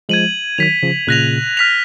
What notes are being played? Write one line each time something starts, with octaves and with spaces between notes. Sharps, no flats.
F3 G#3 G#6 D#7 F#7
D#3 F#3 G#6 B6 F7
C#3 F3
A#2 C#3 F#6 A#6 F7
F6 B6 F7